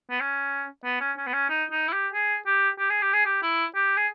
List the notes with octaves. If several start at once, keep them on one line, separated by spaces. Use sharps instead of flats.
B3
C#4
B3
C#4
C#4
B3
C#4
D#4
D#4
E4
G4
G#4
G4
G4
G#4
G4
G#4
G4
E4
G4
G#4